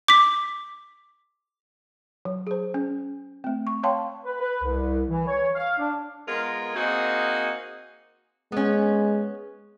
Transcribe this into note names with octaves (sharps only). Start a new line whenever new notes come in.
D6 B6
F#3
G#4 C5
C#4
A3 C4
C#6
C#5 F5 G5 A5 C6
B4
B4
C2
E3
C#5
F5
D4
G#3 B3 F4 A#4
A#3 C4 D#4 F#4 G#4
G#3 B3 C#4